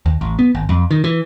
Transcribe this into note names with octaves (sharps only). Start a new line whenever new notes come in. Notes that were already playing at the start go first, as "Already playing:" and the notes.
D#2
A1
B3
G#1
F2
D#3
E3